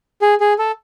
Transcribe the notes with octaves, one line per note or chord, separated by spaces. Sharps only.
G#4
G#4
A4